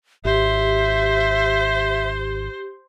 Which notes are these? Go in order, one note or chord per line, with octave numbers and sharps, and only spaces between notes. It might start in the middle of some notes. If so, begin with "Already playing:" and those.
G#1 G4 C5 E5